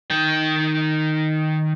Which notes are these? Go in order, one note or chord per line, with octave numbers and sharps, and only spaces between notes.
D#3 G5